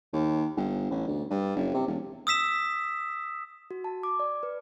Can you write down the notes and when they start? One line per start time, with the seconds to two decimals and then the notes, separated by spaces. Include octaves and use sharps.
0.13 D#2
0.57 G1
0.90 A1
1.07 D2
1.30 G2
1.56 F#1
1.74 C3
1.87 E1
2.27 D#6 E6 B6 E7
3.71 F#4
3.84 A5
4.03 D6
4.20 D5
4.43 B4